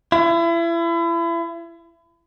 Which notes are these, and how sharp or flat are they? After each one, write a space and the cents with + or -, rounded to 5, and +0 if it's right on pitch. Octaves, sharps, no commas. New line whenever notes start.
E4 +35